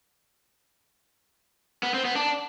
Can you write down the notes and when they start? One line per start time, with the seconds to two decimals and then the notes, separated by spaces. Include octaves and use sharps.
1.83 B3
1.94 C4
2.05 B3
2.16 D4